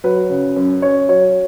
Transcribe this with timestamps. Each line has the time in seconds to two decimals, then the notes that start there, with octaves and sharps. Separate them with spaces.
0.04 F#3 B4
0.30 C#3
0.56 F#2
0.82 C#4 C#5
1.09 F#3 C#5